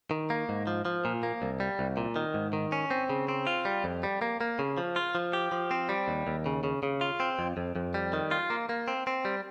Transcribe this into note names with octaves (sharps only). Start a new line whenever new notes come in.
D#3
A#3
G#2
F3
F3
A#2
A#3
C2
G3
C2
A#2
D#3
G#2
D#3
C#4
C4
C#3
C4
F4
G3
F2
G3
A#3
A#3
C#3
F3
F4
F3
G4
F3
C4
G3
D#2
D#2
C#3
C#3
C#3
F4
C4
F2
F2
F2
G3
D#3
F4
A#3
A#3
C4
C4
G3